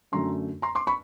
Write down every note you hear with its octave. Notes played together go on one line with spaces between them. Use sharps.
F#2 D3 F#3 A3 A#5 C6
A#5 C6
C6 D6
B5 C#6